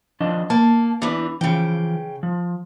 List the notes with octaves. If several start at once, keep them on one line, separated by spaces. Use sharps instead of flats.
F3 D4 D#5
A#3 A5
E2 E3 D4
C#3 E3 F3 G5
F3